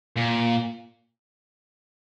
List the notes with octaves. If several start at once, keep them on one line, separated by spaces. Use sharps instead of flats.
A#2